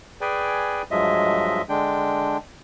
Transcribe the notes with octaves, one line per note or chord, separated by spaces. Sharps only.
G#4 B4 D5 G5 G#5
G2 F3 F#3 G#3 D#5 E5
D3 G#3 D4 G5